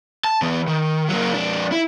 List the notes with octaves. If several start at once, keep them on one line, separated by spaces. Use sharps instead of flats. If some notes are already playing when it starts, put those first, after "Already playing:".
A5
E3 B3
D#3
F#3 A#3
F2 D4
E4